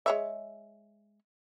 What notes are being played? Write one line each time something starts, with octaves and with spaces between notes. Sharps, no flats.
G#3 C#5 E5